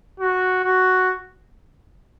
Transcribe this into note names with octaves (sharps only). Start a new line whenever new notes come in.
F#4
F#4